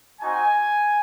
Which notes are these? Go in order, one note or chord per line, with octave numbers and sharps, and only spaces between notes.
C4 D#4 F#4 G#5